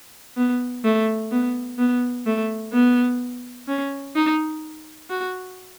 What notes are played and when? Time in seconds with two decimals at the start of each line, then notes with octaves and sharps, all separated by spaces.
0.37 B3
0.84 A3
1.31 B3
1.78 B3
2.26 A3
2.73 B3
3.68 C#4
4.15 D#4
5.10 F#4